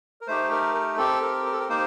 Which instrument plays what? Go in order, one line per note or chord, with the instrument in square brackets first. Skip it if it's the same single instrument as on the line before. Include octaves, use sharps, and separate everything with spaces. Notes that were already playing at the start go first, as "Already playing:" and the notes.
[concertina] A#4
A3 D#4 G4 C5
A#4
A#4
C4 G4 A4
A#4
A#4
A4
A#4
A#3 D#4 G4 C5